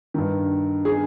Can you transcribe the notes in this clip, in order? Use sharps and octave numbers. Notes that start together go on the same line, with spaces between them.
G2 D#3
G#4